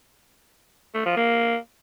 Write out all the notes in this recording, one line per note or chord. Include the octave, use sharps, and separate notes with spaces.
A3
F3
A#3